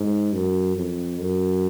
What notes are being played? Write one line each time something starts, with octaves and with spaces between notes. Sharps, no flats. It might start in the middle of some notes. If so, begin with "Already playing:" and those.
Already playing: G#2
F#2
F2
F#2